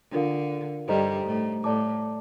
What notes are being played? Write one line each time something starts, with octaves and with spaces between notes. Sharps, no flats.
D3 D4 F4 A#4 F5
G2 G3 D#4 A4 C5 D#5 A#5
A2 A3
A2 A3 A4 D5 A5 D6